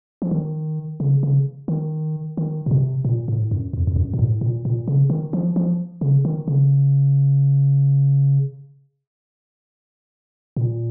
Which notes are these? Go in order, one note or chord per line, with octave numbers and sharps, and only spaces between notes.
F3
D#3
C#3
C#3
D#3
D#3
A#2
C3
A#2
A2
F#2
F2
F2
F#2
A#2
A2
A#2
A#2
C#3
D#3
F3
F3
C#3
D#3
C#3
A#2